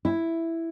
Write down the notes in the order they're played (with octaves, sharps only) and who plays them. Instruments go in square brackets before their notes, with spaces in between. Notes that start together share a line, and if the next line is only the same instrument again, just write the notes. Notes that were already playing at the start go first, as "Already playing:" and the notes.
[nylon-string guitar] E4